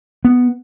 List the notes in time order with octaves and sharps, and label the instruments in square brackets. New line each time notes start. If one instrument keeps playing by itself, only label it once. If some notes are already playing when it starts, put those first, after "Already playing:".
[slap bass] B3